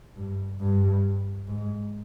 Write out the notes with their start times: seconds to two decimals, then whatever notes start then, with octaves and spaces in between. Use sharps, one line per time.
0.16 G2
0.60 G2
1.47 G#2